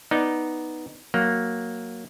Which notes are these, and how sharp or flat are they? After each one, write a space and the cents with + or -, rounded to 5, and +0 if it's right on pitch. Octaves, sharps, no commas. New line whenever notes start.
B3 +0 D#4 +0 D5 +5
F#3 +0 A#3 +0